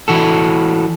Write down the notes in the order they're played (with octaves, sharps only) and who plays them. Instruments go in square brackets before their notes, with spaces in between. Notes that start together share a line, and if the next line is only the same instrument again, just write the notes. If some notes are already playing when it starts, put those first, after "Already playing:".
[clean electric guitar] E3 F#4 A4